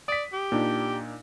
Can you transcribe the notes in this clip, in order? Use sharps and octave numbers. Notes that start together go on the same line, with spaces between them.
D5 D#6 B6
G4
A#2 D4 D#4